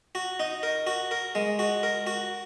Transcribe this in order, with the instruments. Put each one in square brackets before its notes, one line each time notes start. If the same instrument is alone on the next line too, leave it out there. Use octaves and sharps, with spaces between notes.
[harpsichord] F#4
D#4
A#4
F#4
A#4
G#3
F#4
A#4
F#4